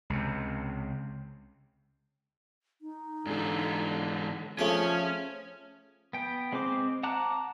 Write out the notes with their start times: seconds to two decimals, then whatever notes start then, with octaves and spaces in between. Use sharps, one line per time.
0.10 C#2 C3
2.82 D#4
3.27 G#2 D3 E3
4.59 F3 A3 C#4 D4 G#4
6.13 B3 G5
6.52 G#3 C4 G#4 C5 D6
7.03 F#5 A5 A#5 D6 F#6